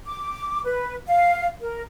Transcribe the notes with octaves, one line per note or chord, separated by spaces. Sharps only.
D6
B4
F5
A#4